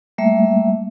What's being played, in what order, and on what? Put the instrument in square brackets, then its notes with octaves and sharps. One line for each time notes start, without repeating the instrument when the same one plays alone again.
[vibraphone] G3 A3 A#3 E5